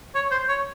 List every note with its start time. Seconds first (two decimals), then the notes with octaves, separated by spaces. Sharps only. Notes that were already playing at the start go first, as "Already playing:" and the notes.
0.15 C#5
0.31 C5
0.49 C#5